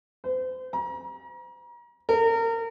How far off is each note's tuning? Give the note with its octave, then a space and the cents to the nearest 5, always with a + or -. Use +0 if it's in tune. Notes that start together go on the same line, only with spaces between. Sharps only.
C5 -35
A#5 +35
A#4 -30